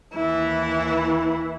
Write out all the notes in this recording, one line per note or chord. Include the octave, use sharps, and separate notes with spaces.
D#2 E3 E4